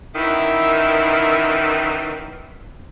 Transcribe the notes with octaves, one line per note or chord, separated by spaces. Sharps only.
F#2 D#3 E3 E4